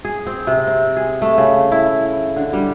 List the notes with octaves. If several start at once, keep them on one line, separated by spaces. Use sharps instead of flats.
G#4
C4
C3
C4
G#4
A3
C#3
E4
D3
G3